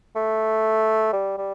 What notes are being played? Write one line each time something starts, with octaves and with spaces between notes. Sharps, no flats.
A3
G3
G3